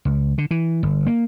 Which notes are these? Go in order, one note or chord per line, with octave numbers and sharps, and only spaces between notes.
C#2
D3
E3
G1
A#3